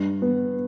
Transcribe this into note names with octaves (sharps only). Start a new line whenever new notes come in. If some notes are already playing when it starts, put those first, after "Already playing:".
Already playing: G2
B3